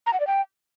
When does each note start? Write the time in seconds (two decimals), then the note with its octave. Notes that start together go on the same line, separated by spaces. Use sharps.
0.06 A#5
0.13 F#5
0.20 D5
0.27 G5